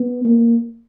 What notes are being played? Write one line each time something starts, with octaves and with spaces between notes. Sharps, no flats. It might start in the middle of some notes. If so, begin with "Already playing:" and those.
Already playing: B3
A#3